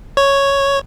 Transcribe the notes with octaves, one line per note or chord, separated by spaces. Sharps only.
C#5